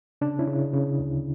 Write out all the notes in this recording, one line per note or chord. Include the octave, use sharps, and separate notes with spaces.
C#3 D4
C#4 E4
C#3
C#3
D2